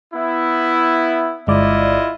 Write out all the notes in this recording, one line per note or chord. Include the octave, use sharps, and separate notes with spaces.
B3 E4
G1 G#3 E4 F4 D5 D#5